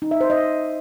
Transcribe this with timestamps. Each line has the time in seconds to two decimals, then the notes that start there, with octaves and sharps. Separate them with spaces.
0.02 D#4
0.11 E5
0.21 C5
0.30 D#5